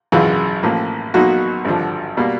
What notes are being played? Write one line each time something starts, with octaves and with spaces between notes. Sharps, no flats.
G#1 F#2 C#3 E3 F4
A1 A2 F3 A#3
B1 B2 F#3 A#3 D#4 F#4
G#1 G2 D3 F3
B2 G3 A#3